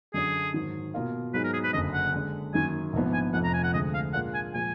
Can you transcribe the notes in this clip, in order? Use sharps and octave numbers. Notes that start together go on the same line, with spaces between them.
F#2 D3 F#3 D4 G#4
G#2 D#3 F#3
B2 A#3 F4 A#4 F5
G#2 F#3 B3 D#4 G#4 B4
A#4
G#4
B4
F#1 F#2 D3 D#5
F#5
D3 G#3 D4
F#2 D#3 A#3 G#5
A#1 G#2 F3 B3 D4
G#5
F1 F2 F3 F#5
A#5
G#5
F#5
D2 D3 G#3 D#5
F5
A#2 G#3 D4 F4 A#4 F#5
G#5
A#2 F3 G#3 G#5